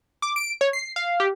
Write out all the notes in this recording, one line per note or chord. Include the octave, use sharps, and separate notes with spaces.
D6
D7
C#5
C7
F5
G4